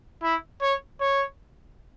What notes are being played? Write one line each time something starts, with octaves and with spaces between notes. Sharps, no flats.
E4
C#5
C#5